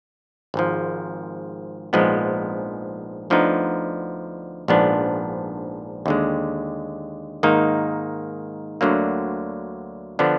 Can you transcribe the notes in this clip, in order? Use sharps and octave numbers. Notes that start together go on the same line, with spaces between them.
G#1 G#2 F3
A#1 G#2 F3 G#3 B3
D2 D3 F3 B3 D#4
A#1 G#2 F3 B3 D4
D#2 D3 G#3
G#2 D#3 A#3 D#4
D2 D3 F#3 A#3
D3 F3 B3 D4